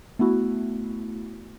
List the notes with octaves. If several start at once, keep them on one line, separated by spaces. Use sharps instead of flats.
A3 B3 E4 F#4